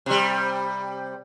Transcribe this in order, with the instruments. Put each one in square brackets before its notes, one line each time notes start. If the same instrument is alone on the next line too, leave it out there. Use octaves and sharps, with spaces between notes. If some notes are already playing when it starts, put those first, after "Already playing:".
[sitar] C3 G3